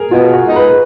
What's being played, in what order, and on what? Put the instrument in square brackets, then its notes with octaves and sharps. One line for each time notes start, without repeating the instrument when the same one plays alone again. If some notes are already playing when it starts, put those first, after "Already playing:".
Already playing: [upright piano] G#4 A#4
[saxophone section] B2 [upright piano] F4
[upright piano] F#4
[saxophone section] G#3 B3 D#4
[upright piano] B4
B4